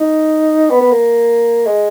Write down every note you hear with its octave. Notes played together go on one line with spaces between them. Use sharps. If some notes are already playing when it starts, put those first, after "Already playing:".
Already playing: D#4
B3
B3
A#3
G#3